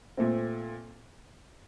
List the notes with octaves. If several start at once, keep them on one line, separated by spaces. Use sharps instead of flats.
A#2 A3 C4